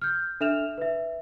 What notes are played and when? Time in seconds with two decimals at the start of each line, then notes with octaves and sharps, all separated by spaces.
0.02 F6 G6
0.41 D4 A4 E5 F6 E7 F7
0.78 B4 E5